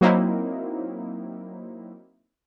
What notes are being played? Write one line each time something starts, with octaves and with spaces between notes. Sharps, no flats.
F#3 A#3 C4 D#4 E4